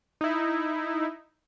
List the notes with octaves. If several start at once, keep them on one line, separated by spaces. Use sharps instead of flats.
D#4 E4